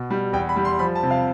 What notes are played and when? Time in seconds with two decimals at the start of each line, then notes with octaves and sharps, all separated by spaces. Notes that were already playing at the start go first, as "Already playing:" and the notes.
Already playing: B2
0.10 G3
0.33 E2 G5
0.49 B5
0.56 G3
0.65 C6
0.79 F3 B5
0.95 A5
1.03 C3
1.11 F5